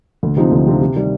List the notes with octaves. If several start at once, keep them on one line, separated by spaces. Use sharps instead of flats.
D2
C3 F3 C4 D#4
D2
C3 F3 C4 D#4
C3
D#3 G3